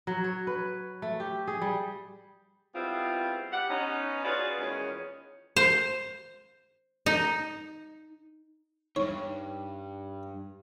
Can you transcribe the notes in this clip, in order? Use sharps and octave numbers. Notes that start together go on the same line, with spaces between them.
F#3
C#5
B4
A3
G4
G#4
G3
G3 G#3 B3 C4 E4 F4
G3 G4 D5 F#5
B3 C#4 D#4
F4 F#4 G#4 B4 C#5 D5
E2 A#2 D#3 G#3 C#4
C5
D#4
E2 G2 D#4 C#5